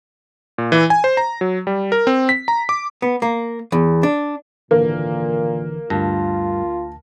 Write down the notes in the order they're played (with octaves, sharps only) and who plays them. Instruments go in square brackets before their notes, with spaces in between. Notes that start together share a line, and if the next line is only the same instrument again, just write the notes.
[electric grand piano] A#2
E3
G#5
C5
A#5
F#3
G3
A#4
C4
B6
A#5
D6
[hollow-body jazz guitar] B3
A#3
E2
D4
[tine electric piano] G#1 D3 E3 [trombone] A#2 [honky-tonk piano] A#3
[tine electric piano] D2 A5 A#6 [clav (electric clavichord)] G2 [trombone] F4